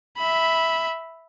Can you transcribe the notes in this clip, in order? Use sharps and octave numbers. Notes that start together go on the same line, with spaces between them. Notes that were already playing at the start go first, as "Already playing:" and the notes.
E5 B5